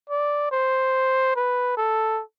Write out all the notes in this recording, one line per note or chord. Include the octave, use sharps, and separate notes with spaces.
D5
C5
B4
A4